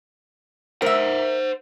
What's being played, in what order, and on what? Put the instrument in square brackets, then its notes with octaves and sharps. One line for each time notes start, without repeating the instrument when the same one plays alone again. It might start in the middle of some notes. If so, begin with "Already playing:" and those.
[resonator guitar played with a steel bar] A#4 E5 [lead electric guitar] C5 F#5